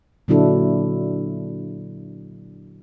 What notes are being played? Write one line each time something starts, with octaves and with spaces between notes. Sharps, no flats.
A#2 D3 F#3 D4 E4 A4